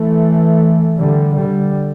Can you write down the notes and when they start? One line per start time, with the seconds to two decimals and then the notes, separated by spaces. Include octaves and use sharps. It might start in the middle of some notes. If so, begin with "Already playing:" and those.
Already playing: E3 A3
0.97 D3 G3
1.36 D3 G3